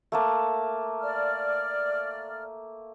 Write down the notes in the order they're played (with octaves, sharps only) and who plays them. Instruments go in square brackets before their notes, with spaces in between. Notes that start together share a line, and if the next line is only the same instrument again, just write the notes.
[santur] A3 A#3 A5
[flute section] D5 F6